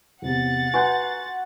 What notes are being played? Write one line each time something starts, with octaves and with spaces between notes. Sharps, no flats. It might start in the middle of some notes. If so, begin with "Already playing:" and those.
E2 C3 G4 F#5 A6
F#4 B4 G#5 A#5 C6 G6